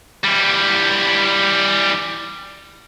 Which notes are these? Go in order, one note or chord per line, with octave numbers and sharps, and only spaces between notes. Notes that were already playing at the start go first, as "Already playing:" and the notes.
E3 G3